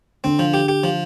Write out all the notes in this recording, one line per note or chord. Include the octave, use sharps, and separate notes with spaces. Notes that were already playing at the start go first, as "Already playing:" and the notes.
D3 C4
F3
G4
G4
F3